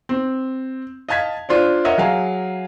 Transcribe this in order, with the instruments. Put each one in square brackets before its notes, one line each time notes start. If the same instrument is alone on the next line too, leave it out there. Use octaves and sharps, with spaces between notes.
[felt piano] C4
D#5 F5 A5 G#6 B6
D4 F4 C5 D5
A#4 C#5 D#5 E5 F#5
F#3 G#4 F5 A#5